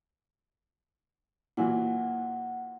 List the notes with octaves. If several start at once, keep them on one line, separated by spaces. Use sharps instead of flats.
A#2 E3 F#3 F#5